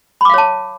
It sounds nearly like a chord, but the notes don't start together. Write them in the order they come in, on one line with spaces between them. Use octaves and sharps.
B5 D6 F5 C#5 A5